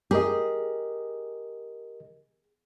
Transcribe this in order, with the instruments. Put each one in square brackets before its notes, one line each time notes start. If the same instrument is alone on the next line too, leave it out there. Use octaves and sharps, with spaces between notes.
[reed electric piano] G4 A#4 D#5 [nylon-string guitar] G#4